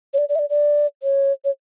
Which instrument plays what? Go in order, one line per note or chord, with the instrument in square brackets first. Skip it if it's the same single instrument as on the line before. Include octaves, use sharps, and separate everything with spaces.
[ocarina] C#5
D5
D5
E5
D5
D5
C#5
C#5